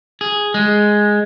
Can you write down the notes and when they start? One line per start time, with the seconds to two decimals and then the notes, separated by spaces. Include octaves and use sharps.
0.21 G#4
0.54 G#3